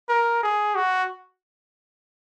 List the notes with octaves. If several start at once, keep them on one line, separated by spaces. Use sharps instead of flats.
A#4
G#4
F#4